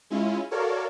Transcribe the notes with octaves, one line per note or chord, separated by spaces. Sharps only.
G#3 C#4 E4 F4
F#4 A4 A#4 C#5 D5 F5